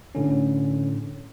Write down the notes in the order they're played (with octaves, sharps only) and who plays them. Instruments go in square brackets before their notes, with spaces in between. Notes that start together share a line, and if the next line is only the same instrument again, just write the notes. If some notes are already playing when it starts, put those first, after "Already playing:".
[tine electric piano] A2 D3 C#4